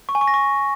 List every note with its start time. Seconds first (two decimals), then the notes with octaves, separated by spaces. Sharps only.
0.09 C#6
0.15 G#5
0.21 C#6
0.28 A#6
0.34 C#6